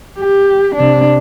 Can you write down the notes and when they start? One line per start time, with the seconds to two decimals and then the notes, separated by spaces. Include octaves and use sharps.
0.18 G4
0.75 C3 D4